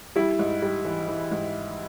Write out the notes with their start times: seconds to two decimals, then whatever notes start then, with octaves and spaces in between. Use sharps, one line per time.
0.16 G3 E4
0.39 G#2
0.62 G3
0.85 E3
1.08 E3
1.31 G#2